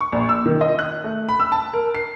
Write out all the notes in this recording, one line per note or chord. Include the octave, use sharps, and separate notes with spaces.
C#6
A#1
E6
D#3
D#5
F#6
A3
B5
E6
A5
A#4
C7